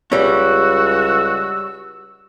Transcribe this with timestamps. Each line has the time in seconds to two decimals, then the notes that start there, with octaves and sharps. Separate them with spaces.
0.12 C#2 G3 C#4 F#4 E6